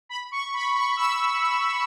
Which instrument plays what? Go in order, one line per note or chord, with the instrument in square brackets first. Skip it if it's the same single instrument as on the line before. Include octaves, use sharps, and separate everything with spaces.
[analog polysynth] B5
C#6
B5
C#6
E6